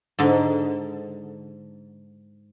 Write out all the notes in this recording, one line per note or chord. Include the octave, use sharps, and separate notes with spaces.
G#2 D3